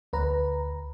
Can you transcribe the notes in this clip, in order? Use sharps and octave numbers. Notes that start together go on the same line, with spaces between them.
D2 B4 A#5